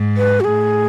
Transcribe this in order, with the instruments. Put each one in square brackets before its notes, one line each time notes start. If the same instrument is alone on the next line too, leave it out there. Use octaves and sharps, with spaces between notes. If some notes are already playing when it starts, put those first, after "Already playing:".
Already playing: [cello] G#2
[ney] B4
F#4
[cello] A2 [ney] G#4